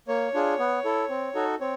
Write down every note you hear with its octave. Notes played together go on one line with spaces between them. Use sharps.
A#3 C#5
D4 F4 G#4
B3
E4 A4
C4
D#4 F#4 A4
C4 C#5